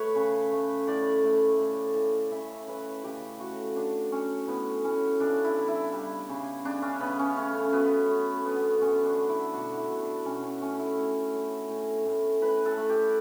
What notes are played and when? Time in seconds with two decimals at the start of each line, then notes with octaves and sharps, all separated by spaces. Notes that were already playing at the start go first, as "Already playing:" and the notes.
Already playing: A3 B4 C#5
0.15 C#3
0.51 A3
0.87 A2 D5
1.24 A3
1.59 A2
1.95 A2
2.32 C#3 E5
2.68 E3 B4
3.03 C#3 G4
3.40 A3 F#4
3.76 F#3 D4
4.12 F#3 C#4
4.48 A2 B3
4.84 A2 C#4
5.20 C#3 D4
5.44 E4
5.56 G3
5.68 E4
5.92 G3
6.29 C#3
6.65 C#3 D4
6.82 C#4
7.00 C#3 B3
7.19 C#4
7.36 A3 C#4
7.72 F#3 B3
8.09 A3
8.45 D3 B3
8.81 D3 C#4
9.05 D4
9.17 A3
9.29 E4
9.53 B2 F#4
9.77 E4
9.89 B2
10.02 D4
10.25 B2 C#4
10.43 C#4
10.61 A3 C#4
10.79 E4
10.97 A2
11.34 A3
11.69 A2
12.06 A2
12.42 A2 B4
12.66 A4
12.77 A3
12.89 G4